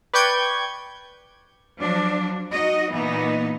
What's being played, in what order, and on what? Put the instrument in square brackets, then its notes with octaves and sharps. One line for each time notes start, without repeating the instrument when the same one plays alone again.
[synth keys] B4 D5 G5 C#6 G6 G#6
[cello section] F3 F#3 D4
D#4 F#4 D#5
A#2 E3 B3 D#4